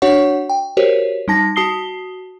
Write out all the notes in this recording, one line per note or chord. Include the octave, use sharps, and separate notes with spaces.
D4 F#4 C#5 F#5 C#6
G5
F#4 G4 A#4 C5 C#5
G3 D#4 A5 A#6
F#4 A5 D#6 C7 G7